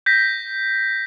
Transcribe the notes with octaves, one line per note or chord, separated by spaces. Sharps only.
G6 A#6 B6